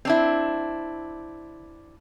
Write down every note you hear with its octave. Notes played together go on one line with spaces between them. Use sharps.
C4 D4 E4